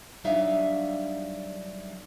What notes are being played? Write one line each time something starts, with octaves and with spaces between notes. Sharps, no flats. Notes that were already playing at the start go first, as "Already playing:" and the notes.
F#3 G3 D4 D#4 E5 F5